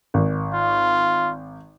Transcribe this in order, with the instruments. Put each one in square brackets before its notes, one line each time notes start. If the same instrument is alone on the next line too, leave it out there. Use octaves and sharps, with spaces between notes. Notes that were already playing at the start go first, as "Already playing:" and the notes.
[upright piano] G#1
[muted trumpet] F4